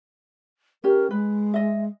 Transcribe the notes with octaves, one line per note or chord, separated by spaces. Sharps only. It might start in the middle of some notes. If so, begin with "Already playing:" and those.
C#4 G4 A#4
G#3 B4
D#5 E5